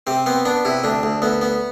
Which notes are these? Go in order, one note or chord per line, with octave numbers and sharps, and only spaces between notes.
C3 C4
B3 C4
B3 D4
C3 E4
D2 D4
D2
D2 B3
B3